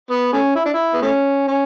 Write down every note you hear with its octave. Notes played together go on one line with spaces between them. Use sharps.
B3
A3 C#4
E4
D4
E4
B3
A3 C#4
C#4